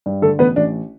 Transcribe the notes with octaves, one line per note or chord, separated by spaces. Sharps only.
G2
D3 A3 A4
A1 B3 B4
A1 D4